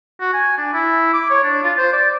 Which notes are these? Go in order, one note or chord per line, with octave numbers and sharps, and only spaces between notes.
F#4
G#5
D4
E4
D6
C#5
D4
F4
C5
D5